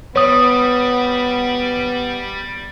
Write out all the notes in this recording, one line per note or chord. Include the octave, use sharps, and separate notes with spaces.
G3 B3 C#5 D#6